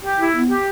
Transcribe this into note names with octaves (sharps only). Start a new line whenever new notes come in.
G4
E4
B3
G4